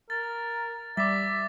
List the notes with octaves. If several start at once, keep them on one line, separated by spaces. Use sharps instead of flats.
A#4 A6
G3 D5 E5 D6 A6